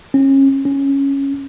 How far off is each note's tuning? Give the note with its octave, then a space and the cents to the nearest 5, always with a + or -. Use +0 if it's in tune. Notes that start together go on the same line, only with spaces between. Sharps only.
C#4 -30
C#4 -5